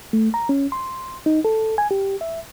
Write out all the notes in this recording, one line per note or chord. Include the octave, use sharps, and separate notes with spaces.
A3
A#5
C#4
C6
D#4
A4
G#5
G4
E5